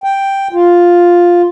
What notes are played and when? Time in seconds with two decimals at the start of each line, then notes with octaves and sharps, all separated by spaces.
0.04 G5
0.53 F4